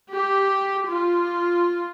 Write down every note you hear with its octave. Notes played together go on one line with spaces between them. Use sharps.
G4
F4